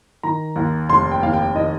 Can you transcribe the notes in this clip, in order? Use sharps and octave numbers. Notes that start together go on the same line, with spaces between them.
D#3 A#5
D#2
F1 C6
G5
D#2 F5
G5
D#3 D#5